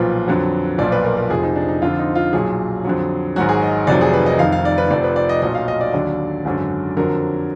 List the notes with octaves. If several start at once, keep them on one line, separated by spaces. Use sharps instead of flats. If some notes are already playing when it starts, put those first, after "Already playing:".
Already playing: B1 A#2 F3 B4
F2 D3 F#3
B1 A#2 F3 D5
B4
A#4
A#4
F1 F2 F3 G#4
D#4
D4
D#4
F2 D3 F3 F4
D#4
F4
B1 A#2 F#3 G#4
F2 D3 F#3
G#1 G#2 F#3 F#4
G#4
D#5
F1 F2 D#3 F#3 D5
G#4
B4
D#5
F1 F2 D#3 F5
F5
D5
B4
F1 F2 F3 D5
B4
D5
D#5
B1 A#2 F#3 D#5
F5
D#5
D5
D#2 D3 F#3
G#1 F#2 D3 F#3
F2 D3 F#3 A#4